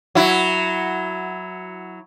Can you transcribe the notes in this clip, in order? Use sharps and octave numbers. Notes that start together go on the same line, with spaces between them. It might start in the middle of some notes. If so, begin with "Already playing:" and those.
F#3 E4